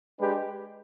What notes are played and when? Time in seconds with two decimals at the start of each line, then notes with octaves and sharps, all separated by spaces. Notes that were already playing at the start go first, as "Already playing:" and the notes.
0.19 G#3 D4 G4 B4